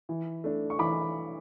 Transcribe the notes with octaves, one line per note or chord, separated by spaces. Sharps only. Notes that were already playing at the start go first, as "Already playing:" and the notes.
E3
A3 D4
C#6
E3 B5 D6